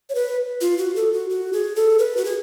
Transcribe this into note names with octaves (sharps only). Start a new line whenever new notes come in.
C#5
B4
F4
F#4
A4
F#4
F#4
G#4
A4
B4
F#4
G#4